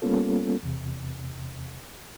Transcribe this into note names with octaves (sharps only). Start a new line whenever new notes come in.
G3 A#3 B3 C#4 F4 A4
E2 C3